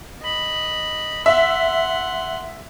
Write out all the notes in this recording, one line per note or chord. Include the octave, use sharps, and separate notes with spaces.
D#5 B5
E5 F#5 C6